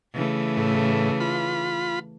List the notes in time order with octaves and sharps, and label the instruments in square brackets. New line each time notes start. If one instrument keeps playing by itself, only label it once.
[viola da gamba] C#3 E3 A3
[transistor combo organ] A2
F4 B5